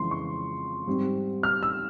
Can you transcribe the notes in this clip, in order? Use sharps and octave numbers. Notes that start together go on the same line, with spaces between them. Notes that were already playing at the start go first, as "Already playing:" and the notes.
Already playing: F2 C#3 E3 G#3 C6
C#6
G#2 G3 C4
F6
E6